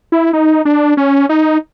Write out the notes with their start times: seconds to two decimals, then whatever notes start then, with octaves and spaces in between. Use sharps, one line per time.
0.12 E4
0.33 D#4
0.65 D4
0.97 C#4
1.29 D#4